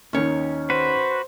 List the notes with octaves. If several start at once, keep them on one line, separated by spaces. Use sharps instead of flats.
D#2 D#3 C#4 C#5
F#4 B4 C5